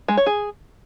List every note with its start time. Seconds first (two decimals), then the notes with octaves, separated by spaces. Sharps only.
0.08 G#3
0.17 C#5
0.26 G#4